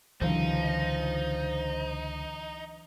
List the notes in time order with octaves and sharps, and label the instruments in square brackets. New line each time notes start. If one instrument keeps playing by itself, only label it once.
[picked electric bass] C#2 D3 [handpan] E3 F#3 D4 [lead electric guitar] D#4 [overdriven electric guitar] C5 F5